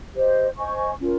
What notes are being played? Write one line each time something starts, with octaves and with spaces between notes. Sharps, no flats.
G4 C5 D#5
C5 D#5 G#5 C#6
C#4 F4 A#4